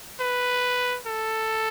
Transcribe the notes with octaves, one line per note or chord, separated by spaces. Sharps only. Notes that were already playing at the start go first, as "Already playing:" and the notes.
B4
A4